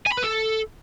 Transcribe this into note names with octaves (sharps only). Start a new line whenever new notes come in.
G#5
B5
B4
A4